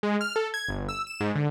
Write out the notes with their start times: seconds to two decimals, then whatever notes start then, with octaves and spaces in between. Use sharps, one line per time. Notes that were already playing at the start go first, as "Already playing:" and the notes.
0.03 G#3
0.21 F6
0.36 A4
0.54 G#6
0.68 G1
0.89 E6
1.07 E7
1.21 G#2
1.36 D3